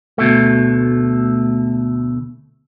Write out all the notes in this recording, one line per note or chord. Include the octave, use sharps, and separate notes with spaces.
D2 B2 A3